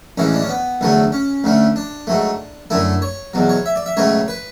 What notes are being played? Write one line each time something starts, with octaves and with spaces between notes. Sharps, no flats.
A1 A2 E3 G#3 C#4
D4
C#4
B3
E2 D3 F#3 A3
C#4
D2 D3 A3
D4
G#2 F#3 A3
F#2 D3 A3 E4
C#5
E2 B2 F#3
C#5
E5
D5
E5
C#2 B2 F#3 A3 C#5
B4